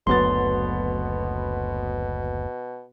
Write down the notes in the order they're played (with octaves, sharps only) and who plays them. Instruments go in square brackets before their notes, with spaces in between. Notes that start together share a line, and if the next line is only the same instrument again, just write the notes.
[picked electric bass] F#1 D2 [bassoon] B2 [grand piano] F#3 B3 A6 [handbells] C6